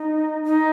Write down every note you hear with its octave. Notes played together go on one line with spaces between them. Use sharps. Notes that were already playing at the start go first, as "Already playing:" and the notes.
Already playing: D#4
D#4